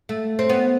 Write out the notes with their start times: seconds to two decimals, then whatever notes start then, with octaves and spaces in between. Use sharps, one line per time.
0.09 A3
0.39 C4
0.49 B3